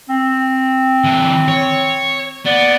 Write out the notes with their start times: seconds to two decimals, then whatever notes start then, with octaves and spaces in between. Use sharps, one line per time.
0.09 C4
1.04 D3 E3
1.48 C#5
2.46 B3 D5